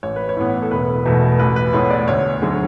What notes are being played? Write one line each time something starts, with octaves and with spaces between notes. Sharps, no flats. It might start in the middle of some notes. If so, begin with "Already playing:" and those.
A1 C#5
B4
C#5
A2 E3 B3
A4
E1 B4
E2 B2 A3
A1 B4
B4
A2 G#3 B3 C#5
D5
D2 C#5
D3 F#3 G#4